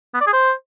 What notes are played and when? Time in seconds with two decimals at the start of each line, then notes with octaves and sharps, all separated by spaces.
0.14 B3
0.21 D5
0.27 G#4
0.33 C5